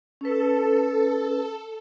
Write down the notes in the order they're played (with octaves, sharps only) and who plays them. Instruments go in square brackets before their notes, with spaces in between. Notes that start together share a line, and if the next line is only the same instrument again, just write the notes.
[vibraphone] C#4 B4 [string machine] A4